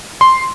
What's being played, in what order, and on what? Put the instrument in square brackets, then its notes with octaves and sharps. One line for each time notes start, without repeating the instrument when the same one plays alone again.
[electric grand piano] C6